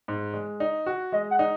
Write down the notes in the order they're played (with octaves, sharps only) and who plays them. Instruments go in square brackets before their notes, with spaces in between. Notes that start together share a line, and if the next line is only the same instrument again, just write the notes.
[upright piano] G#2
G#3
D#4
F#4
[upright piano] G#3 [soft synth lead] D#5
[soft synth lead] F#5
[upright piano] D#4